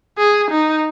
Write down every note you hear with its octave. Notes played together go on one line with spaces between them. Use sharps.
G#4
D#4